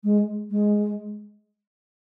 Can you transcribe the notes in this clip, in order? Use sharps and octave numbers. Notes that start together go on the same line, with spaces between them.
G#3
G#3